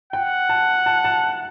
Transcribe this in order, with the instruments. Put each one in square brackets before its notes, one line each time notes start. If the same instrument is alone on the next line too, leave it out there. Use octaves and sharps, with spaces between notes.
[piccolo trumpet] F#5 [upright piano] G5
[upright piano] A5
A5
A5